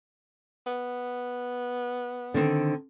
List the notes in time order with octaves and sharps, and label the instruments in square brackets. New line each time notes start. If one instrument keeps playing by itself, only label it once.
[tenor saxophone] B3
[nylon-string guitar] D3 D#3 C4